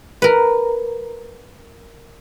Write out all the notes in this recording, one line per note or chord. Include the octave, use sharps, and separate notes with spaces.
A#4 B4